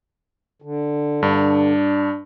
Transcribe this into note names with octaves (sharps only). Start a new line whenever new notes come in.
D3
G2 D4